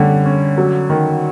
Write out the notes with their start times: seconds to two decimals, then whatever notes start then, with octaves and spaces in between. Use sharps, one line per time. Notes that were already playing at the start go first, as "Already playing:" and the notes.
Already playing: D3 G3 C#4
0.26 C#4
0.58 F#3
0.90 D#3